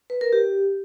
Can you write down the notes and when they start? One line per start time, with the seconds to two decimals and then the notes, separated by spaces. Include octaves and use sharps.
0.10 B4
0.21 A#4
0.33 G4